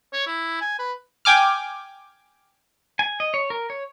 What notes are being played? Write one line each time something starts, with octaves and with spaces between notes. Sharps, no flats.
C#5
E4
G#5
B4
G5 G#5 D6 F6
G#5
D#5
C#5
A#4
C#5